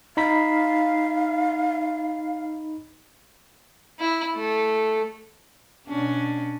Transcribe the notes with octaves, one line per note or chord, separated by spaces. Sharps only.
D#4 F5 B5 B6
E4
A3
B2 C#4 D4